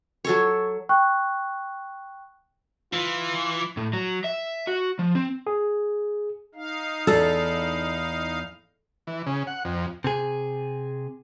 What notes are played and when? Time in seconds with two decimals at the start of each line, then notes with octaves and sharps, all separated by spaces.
0.25 F#3 A4 C#5
0.89 G5 C#6 F#6
2.94 E3 F4
3.77 A2
3.93 F#3
4.24 E5
4.67 F#4
4.99 F3
5.15 C4
5.47 G#4
6.55 D#4 F5
7.07 E2 E4 A4
9.07 E3
9.26 C#3
9.47 F#5
9.65 F2
10.04 C3 G#4